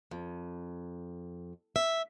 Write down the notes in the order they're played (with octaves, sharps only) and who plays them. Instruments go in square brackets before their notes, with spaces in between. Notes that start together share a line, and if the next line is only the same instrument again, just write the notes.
[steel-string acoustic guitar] F2
E5